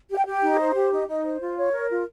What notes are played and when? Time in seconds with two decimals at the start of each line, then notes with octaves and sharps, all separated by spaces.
0.10 G4
0.17 G5
0.26 G4
0.42 D#4
0.59 C5
0.75 G4
0.91 D#4
1.07 D#4
1.24 C5
1.41 F4
1.57 C#5
1.73 A#4
1.90 F4